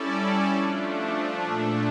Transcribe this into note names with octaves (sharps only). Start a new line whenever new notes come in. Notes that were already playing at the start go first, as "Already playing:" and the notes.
Already playing: G3 C#4 E4 A4 D5
F3 A3 D4
A#2 A3 D4